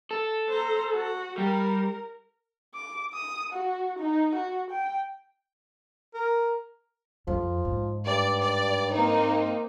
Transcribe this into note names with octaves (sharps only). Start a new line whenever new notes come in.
A4
C5 A#5
F#4
G3 A#4
D6
D#6
F#4
D#4
F#4
G5
A#4
F2 F3
G#2
G2 D5
D5
A#3 C4 D#4